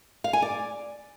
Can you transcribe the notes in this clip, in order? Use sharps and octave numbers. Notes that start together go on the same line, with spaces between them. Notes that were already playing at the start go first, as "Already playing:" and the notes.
F5
G#5
D5